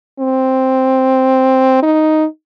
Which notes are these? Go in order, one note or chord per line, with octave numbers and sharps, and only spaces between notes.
C4
D#4